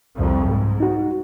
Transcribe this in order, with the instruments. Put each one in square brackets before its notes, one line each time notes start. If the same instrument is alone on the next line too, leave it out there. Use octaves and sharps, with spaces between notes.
[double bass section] C2 F2
G#2
[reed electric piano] D#4 F#4